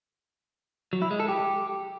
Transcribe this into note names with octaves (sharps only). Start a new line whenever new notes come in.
F#3
E4
G#3
A4
G4